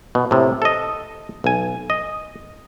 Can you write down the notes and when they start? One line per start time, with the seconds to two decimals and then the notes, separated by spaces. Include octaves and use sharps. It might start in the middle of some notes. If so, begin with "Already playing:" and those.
0.15 B2
0.31 A2 C3
0.62 A4 D#5
1.44 B1 G#5
1.90 D#5